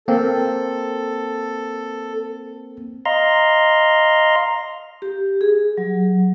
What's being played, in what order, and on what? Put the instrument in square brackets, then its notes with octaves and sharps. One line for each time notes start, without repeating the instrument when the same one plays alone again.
[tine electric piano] A#3 C4 [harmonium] A4
[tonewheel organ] D#5 F5 A#5 C6
[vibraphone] G4
G#4
F#3